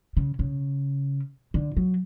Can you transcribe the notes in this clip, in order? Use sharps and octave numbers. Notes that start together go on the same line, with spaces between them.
C#3
C#3
D3
F#3